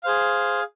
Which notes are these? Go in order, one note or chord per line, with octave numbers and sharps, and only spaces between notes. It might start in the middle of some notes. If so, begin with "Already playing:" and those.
G#4 C5 F5